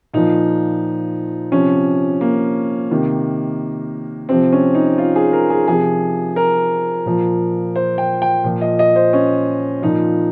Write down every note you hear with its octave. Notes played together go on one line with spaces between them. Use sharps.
A#2 F3 D#4
C3 F3 C#4
A#3
C3 D#3
C3 F3 C4
C#4
D#4
F4
G#4
A#4
G#4
C3 F3 G#4
A#4
A#2 F3
C5
G5
G5
A#2 F3
D#5
D#5
C5
C#4
A#2 F3 D#4